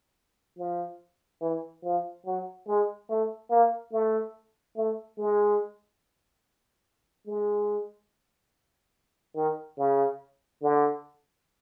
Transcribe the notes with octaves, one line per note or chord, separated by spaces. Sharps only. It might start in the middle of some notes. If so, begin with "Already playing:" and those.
F3
E3
F3
F#3
G#3
A3
A#3
A3
A3
G#3
G#3
D#3
C#3
D3